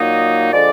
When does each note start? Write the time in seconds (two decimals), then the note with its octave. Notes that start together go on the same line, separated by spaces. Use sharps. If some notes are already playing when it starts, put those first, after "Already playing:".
Already playing: A#2 F#3 A#3 D#4 D#5
0.52 D3 F3 G#3 D5